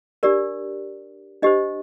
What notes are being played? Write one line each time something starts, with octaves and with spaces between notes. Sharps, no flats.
D4 G4 A#4 D5
D4 G4 C5 D#5